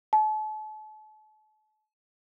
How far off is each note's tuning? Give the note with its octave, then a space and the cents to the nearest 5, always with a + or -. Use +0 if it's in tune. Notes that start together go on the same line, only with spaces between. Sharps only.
A5 -40